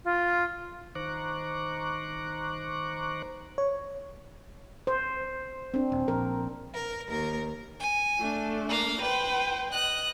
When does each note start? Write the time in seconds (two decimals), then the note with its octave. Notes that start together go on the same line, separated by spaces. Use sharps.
0.05 F4
0.95 D#3 C5 A#5 C#6 D6 F#6
3.58 C#5
4.87 C5
5.74 C4 D4
5.92 D#1
6.08 A#1 A#4
6.74 A#4
7.07 D#2 A#4
7.80 G#5
8.19 A3 D4
8.69 A#3 F5
9.01 B4 C5 G5
9.72 D#5 F#6